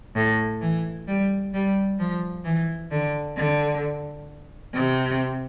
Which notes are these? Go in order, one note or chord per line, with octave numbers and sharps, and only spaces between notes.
A2
E3
G3
G3
F3
E3
D3
D3
C3